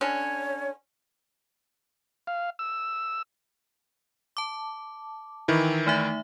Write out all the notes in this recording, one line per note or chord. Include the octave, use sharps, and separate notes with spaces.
D3 C#4 C#5
F5
E6
A5 D6
D#3 E3 E4
A3 D#4 E5